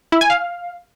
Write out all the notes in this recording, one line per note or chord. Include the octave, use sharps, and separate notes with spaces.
E4
G#5
F5